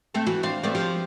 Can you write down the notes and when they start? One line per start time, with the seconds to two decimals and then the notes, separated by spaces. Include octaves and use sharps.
0.14 A3 C4 A4
0.27 E3 F#4
0.43 C4 D4 F5
0.63 A3 B3 C4 D4
0.75 F3 G4